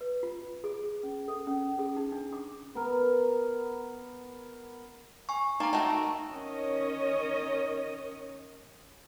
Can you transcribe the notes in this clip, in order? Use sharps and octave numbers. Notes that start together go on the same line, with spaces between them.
B4
F4
G#4
C#4
A4
C#4
G#4
D#4
D4
D6
B3 A#4
G#5 C#6
A#3 D#4 A#5
D#3 A3 F#4
D#3 C#4 C#5 D#5